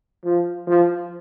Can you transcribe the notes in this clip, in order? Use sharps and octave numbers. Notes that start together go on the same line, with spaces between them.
F3
F3